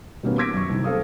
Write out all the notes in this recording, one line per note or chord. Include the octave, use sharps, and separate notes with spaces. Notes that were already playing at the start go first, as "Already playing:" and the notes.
B2 D#3 G3 A#3 B3 C#4
D6 E6 G#6 A#6 B6 D7
F#2 C#6
C2 D#3
C4 A4 F5 D#6